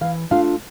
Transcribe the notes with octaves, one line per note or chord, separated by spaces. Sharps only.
E3 F5
A3 D4 F4 F5